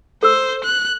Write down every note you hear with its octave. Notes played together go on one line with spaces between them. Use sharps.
A4 C5 E6
F#6